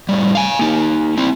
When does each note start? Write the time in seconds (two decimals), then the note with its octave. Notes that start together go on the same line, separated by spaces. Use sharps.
0.09 A2 G3
0.35 F5 G#5
0.59 A#3 D#4
1.17 C4 E4